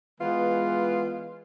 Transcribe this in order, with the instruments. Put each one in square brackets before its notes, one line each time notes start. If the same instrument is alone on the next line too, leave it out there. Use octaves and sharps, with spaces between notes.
[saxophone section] E3 G#3 B3 F4